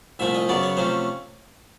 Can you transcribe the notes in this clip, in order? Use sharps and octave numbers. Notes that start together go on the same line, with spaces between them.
C2 A#2 F3 A3 C4 E5
D#5
F#2 C#3 F#3 B3 D5
C#5
C3 F3 A3 C#4 C5